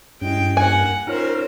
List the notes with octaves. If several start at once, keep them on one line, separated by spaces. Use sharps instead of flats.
G2 G#3 C#4 E4 G5
A#3 F#5 G#5
C#4 D#4 F4 A#4 C5 C#5